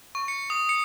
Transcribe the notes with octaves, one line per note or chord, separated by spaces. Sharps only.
C#6
C#7
D#6
C#7